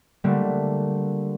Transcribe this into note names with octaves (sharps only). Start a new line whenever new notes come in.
D3 G3 A3 A#3